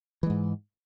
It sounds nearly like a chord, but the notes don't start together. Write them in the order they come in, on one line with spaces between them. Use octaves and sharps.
E3 G#3 G#2